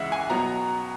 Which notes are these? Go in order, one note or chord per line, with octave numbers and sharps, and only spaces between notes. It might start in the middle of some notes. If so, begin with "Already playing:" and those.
Already playing: C#2 C#3 E3 G#3 E5 F#5
G#5
B2 F#3 B3 A#5